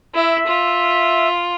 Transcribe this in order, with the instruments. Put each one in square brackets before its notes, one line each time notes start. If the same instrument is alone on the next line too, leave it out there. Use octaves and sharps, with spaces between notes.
[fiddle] E4 [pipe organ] E5
[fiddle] F4